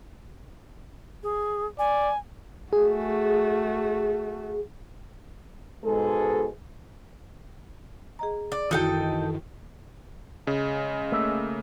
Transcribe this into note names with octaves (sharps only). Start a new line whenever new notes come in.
G#4
D5 G#5
A3 F#4 G#4
G#2 B2 G#3 G#4 A4
G#4 D#5 A#5
D5
F#2 D#3 E3 D#4 E4 F#4 A4 G5
C#3 G#3
A3 A#3 E5